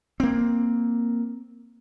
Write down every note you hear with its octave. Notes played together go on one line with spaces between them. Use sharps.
A#3 C4